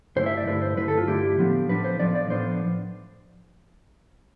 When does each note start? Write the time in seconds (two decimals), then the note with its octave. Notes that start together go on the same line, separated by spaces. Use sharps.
0.16 G2 D3 A3 E4 C5
0.26 E5
0.37 D5
0.47 G2 D3 A3 E4 B4
0.62 C5
0.77 G2 D3 A3 E4 B4
0.88 A4
0.98 F4
1.08 G2 D3 A3 E4 G4
1.38 A2 F3 B3 D4
1.69 A2 F3 B3 D4 B4
1.84 C5
2.00 A2 F3 B3 D4 D5
2.15 D5
2.30 A2 F3 B3 D4 C5